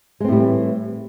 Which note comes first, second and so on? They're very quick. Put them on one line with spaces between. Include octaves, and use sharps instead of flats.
G#3 C4 A2 G3 E3